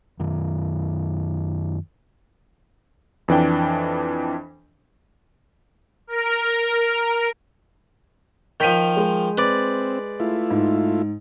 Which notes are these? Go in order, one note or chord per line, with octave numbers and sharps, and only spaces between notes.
F#2 D#3
F2 E3 D4 G5
A#4
D#3 F3 G6 B6 D#7
G#3
C4 B4 D5
A3 E4 F4
G#2